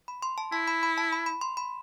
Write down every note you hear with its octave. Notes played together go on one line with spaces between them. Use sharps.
B5
C6
A5
E4 A5
B5
B5
A5
B5
B5
C6
B5